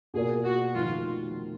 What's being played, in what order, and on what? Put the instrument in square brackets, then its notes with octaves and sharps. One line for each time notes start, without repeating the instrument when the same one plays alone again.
[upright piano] B2 A#3 F4 A#4 D5 [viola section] G#4
[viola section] F#4
[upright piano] F1 F2 D#3 [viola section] F4